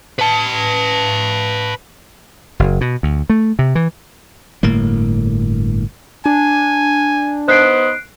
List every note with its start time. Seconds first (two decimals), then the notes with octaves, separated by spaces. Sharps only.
0.19 B4 A5
2.59 F#1
2.81 B2
3.03 D2
3.30 A3
3.59 C3
3.75 E3
4.63 G1 A2 A#3
6.26 D4 G#5
7.48 B3 D#4 C5 F#6 C7 D7